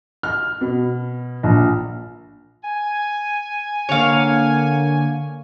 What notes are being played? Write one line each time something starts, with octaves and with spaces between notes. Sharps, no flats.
F6
B2
A#1
G#5
D3 A#3 C#5 F5